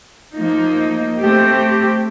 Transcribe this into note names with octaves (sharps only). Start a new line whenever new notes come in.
F3 A#3 D#4
A3 C4 G4